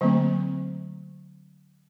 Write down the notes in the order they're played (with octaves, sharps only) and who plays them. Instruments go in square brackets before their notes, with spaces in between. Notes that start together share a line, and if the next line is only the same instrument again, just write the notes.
[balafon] D3 F#3 A3 A#3 C4